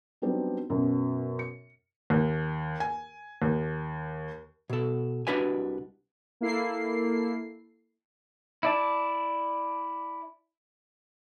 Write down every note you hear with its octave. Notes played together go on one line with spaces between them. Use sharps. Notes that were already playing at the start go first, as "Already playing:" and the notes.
F#3 G3 B3 C4 D4 D#4
F#2 B2
C#7
D#2
G#5
D#2
B2 A4
C2 D4 F#4 B4 D#5 G#5
A#3 E4 A4 C7
E4 D5 A5